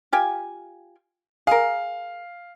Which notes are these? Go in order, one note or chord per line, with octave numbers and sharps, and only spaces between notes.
F4 G4 G#5
G#4 A#4 F5